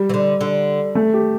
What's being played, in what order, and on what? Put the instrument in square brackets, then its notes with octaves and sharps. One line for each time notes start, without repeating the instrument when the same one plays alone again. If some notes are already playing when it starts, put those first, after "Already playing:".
Already playing: [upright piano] G3
[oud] E3
D3
D3
[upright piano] A3
G4